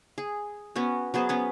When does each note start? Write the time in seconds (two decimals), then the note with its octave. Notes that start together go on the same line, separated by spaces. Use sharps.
0.18 G#4
0.76 B3 C#4 F#4
1.14 F#3 B3 G#4 C5
1.29 B3 C#4 B4